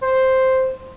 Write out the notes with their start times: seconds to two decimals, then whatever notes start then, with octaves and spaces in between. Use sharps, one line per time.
0.02 C5